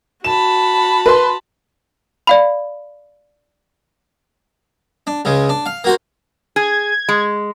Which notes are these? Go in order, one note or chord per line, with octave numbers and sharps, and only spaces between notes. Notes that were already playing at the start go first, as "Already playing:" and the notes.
F#4 A5 B5 E7
B4 C6
D5 F5 B5
D4
C#2 C#3 G#3
D4
F5
A#3 F#4 C5
G#4 G#6
G#3